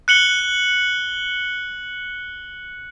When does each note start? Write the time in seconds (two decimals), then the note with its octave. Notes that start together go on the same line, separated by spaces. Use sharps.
0.08 F#6 C#7 F#7 G7